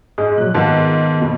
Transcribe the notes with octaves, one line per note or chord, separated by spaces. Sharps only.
G#2 G#3 G#4
A#2 F3 F#3 F#6
G#2 D#3 A#3 B3 F4 A5
F2 B2